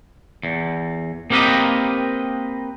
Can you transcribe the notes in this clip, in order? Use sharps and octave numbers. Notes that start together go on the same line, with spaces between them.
E2
A#3 C4 G4 A#4 B4 D#5